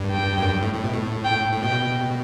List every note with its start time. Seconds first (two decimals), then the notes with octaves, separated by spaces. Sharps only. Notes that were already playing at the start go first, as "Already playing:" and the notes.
Already playing: G2
0.11 G5
0.38 F#2
0.49 G2
0.62 A2
0.74 A2
0.84 B2
0.93 A2
1.25 G5
1.53 A2
1.63 B2 G5